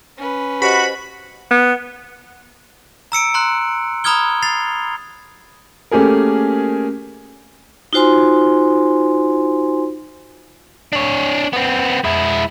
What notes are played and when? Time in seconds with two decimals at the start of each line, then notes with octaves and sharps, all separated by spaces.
0.18 C#4 B4
0.62 F#4 G4 C5 D#5 B5
1.51 B3
3.12 A#5 E6 C#7 D7
3.34 A#5 C6 F#6
4.04 A#5 B5 D#6 F6 G#6 G7
4.43 A6 C7 F7
5.91 A3 A#3 C#4 G4 G#4 A#4
7.93 D#4 F4 F#4 C5 G#5 C6
10.93 D4 C#5
11.53 B3 C4
12.04 G#3 E4